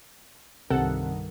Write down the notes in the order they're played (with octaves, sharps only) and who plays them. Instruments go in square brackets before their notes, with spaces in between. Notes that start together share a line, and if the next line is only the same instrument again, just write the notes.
[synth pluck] C2 A4 F#5 [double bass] G2 D#3 [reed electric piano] C3